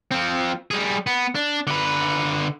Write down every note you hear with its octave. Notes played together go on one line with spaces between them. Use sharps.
F3 C4
G3 G#4
B3
D4
D3 B4